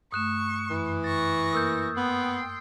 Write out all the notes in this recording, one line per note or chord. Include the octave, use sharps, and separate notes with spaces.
G2 A3 C#6 D#6 F#6 E7
F#2 E3 B5
C#6 A6 A#6
A#3 A#4 D#6 E6 G6
B3 G5 C6